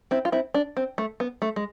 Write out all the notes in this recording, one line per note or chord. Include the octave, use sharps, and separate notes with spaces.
C4 E4
F4
C4 E4
D4
C4
A3
B3
A3
G#3